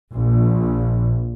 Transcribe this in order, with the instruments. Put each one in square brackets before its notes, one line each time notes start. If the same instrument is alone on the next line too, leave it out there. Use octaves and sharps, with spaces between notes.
[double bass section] A#1